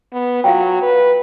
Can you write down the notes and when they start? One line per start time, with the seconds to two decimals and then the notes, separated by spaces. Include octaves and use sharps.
0.13 B3
0.44 F#3 F4 F5 G5
0.82 B4